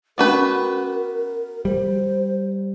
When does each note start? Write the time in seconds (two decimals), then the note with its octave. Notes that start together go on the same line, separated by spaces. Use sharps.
0.18 B3 C#4 F#4 A#4 B4 D6
1.65 G3 C5